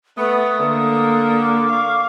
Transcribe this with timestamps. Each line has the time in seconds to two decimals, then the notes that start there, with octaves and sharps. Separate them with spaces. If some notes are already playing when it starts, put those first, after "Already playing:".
0.17 A3 B3 D#6
0.59 D3 A#3
1.41 D6
1.70 F5 C#6